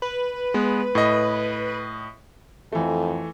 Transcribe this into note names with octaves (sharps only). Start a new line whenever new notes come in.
B4
G#3 B3
A2 D#5
F2 E3 A3